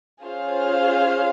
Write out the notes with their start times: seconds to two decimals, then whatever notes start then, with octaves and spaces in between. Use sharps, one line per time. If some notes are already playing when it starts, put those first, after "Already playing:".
0.23 C#4 F4 G#4 C5 F5